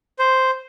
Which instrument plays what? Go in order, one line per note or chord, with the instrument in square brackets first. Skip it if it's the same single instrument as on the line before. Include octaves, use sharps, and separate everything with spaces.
[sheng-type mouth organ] C5